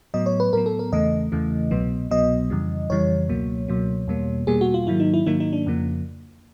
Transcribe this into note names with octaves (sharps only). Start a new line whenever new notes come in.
A2 F#3 B3 D#5
C#5
B4
A2 F#3 B3 A#4
A4
A#4
E2 C#3 E3 A3 D#5
E2 C#3 E3 A3
C2 B2 F#3 B3
C2 B2 F#3 B3 D#5
F2 C#3 E3 G3
F2 C#3 E3 G3 C#5
C#2 B2 F#3 A#3
C#2 B2 F#3 A#3
E2 B2 G3 A#3
E2 B2 G3 A#3 G#4
F#4
F4
G#2 D#3 F#3 A#3 E4
D#4
E4
G#2 D#3 F#3 A#3 D#4
D#4
D4
F2 C#3 F3 A#3